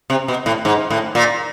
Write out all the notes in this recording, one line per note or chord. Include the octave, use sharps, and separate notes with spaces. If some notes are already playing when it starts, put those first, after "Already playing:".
C3
B2
A2
G#2
A2
A#2